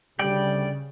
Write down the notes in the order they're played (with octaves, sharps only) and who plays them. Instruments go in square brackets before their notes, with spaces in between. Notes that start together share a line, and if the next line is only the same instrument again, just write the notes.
[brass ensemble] D2 G3 [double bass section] C#3 [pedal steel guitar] D5 G5